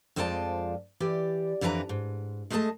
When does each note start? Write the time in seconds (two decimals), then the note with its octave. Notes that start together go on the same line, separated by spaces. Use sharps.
0.16 F2 G#3 C4 F4 D5 A5
1.00 E3 G4 D5
1.61 F2 D3 E3 B4 G#5 A#5
1.89 G#2
2.50 G#3 A3 G#4 D5 D#5 A5